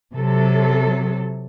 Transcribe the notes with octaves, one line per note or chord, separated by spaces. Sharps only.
C3 F#3 A4